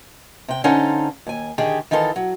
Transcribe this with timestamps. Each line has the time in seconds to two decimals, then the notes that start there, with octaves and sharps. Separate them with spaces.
0.48 C3 G5
0.64 D3 C#4 D#4 A4 C5 F5
1.27 D#2 G#5
1.58 D3 D#3 G4 G#4
1.91 D#3 E3 D#4 F4 A4
2.16 F#3